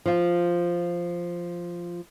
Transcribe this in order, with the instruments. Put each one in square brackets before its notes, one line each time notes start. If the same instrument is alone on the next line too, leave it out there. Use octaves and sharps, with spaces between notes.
[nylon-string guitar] F3 F4